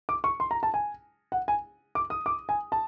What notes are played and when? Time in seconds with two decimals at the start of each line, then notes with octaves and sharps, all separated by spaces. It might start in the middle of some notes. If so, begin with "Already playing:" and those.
0.09 D6
0.24 C#6
0.40 C6
0.51 A#5
0.63 A5
0.74 G#5
1.32 F#5
1.48 G#5
1.95 D6
2.10 D#6
2.26 D6
2.49 G#5
2.72 A5